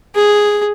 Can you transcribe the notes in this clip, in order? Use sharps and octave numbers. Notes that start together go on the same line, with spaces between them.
G#4